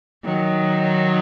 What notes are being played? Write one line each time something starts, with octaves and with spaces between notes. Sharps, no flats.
D#3 F#3